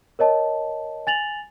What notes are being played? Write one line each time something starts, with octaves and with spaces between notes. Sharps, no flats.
A#4 C#5 D#5 A5
G#5 A6 F7 F#7